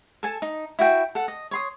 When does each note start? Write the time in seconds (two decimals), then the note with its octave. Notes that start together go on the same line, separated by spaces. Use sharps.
0.23 A4 G#5 A5
0.42 D#4
0.79 E4 F#4 G5
1.15 A4 F#5
1.28 D#5
1.51 C#5 C6 D#6